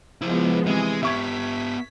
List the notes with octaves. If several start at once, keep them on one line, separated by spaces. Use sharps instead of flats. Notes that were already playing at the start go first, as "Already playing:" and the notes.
F3 G#3 B3 E4 C5
C3 E3 G#3 G#5 D#6
B3 G4 E5 C#6 G#6 B6